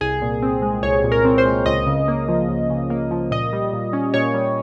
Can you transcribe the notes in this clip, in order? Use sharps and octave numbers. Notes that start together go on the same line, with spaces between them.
C2 G#4
A#2
C4
G#3
C2 C#5
A#2
A#4
C4
C5
G#3
C#2 D#5
C#3
A#3
F3
C#2
C#3
A#3
F3
A#2 D#5
G3
A#2
C#4
A#2 C#5
G3